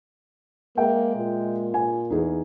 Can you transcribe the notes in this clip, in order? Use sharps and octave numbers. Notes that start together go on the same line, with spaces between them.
G#3 A#3 G#4 E5 G5
A#2
G#5
E2 D#4 G#4